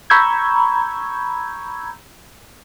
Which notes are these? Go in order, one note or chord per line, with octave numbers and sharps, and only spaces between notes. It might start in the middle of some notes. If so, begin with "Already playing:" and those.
A#5 B5 C#6 E6 G6 G#6